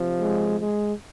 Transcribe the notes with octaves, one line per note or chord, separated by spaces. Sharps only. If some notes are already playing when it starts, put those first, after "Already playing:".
Already playing: C3 F3
G#3
G#3